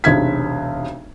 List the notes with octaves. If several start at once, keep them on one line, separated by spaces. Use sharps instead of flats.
E1 B1 C3 G#6 B6